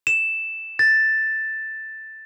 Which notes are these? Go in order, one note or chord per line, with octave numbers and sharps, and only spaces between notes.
E7
A6